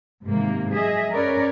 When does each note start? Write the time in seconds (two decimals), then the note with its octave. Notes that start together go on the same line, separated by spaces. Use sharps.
0.24 G#2 C3 D#3 E3 A#3
0.73 F#3 G#4 D#5 E5
1.12 C#4 A#4 B4 C#5 D5